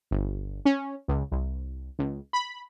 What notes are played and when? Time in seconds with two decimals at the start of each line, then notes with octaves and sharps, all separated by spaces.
0.11 G1
0.65 C#4
1.08 C#2
1.32 C2
1.99 C#2
2.33 B5